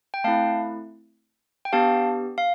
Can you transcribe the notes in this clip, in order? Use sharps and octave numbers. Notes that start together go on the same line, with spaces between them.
G5
A3 C4 E4 F5 A5
G5
B3 D4 G4 F5 A5
F5